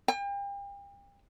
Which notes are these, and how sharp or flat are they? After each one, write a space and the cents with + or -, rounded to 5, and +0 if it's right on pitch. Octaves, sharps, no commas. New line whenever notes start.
G5 +40